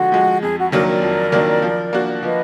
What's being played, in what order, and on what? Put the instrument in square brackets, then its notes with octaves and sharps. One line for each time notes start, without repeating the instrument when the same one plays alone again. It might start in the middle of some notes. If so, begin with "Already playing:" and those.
Already playing: [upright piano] D3 F3 G#3 [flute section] F#4
[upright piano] F3 G#3
[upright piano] F2 [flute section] G#4
[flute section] F#4
[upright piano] D#3 F#3 A#3 D4 [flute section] A#4
[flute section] A#4 D5
[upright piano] F2
D#3 F#3 A#3 D4
F3
A#3 D4 F#4
[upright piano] F3 [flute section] B4 D#5